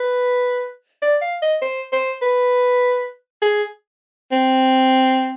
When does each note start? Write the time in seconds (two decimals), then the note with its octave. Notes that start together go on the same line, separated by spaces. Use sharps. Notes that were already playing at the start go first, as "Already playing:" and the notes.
Already playing: B4
1.02 D5
1.21 F5
1.42 D#5
1.62 C5
1.92 C5
2.22 B4
3.42 G#4
4.32 C4